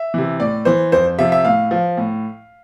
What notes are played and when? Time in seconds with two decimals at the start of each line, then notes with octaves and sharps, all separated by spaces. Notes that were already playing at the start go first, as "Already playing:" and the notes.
Already playing: E5
0.14 C3 E3
0.40 A2 D5
0.65 E3 C5
0.92 F2 C5
1.18 C3 F3 E5
1.32 E5
1.44 A2 F5
1.71 F3
1.97 A2